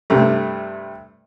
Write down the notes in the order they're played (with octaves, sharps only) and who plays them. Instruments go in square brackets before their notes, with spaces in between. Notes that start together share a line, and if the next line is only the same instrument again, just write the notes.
[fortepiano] G2 C3 A3